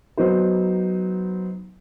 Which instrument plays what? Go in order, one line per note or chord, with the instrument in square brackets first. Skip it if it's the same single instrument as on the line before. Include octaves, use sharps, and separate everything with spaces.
[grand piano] F#3 B3 D#4 C5